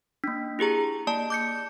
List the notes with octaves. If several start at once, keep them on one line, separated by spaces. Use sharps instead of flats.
A#3 D4
E4 G4 G#4 A#5
A#3 D5 A5
D6 G6 C#7